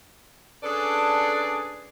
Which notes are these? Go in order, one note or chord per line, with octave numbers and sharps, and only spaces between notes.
C#4 D4 G#4 A4 B4 D5